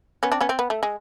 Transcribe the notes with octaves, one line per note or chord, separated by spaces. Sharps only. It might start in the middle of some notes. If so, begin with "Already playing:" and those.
B3 C#4
C4 D4
B3 C#4
C4
B3
A3
G#3